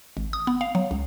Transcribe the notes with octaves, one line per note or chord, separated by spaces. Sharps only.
G#1
D#6
B3
F5
F#3
C#2